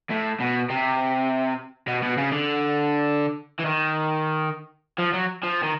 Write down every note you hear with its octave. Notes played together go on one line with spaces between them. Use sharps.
A2
B2
C3
B2
B2
C#3
D3
E3
D#3
F3
F#3
F3
D#3